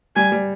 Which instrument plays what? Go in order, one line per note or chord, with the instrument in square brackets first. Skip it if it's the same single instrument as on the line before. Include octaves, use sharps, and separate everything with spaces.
[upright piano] G3 [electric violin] G#5
[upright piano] G3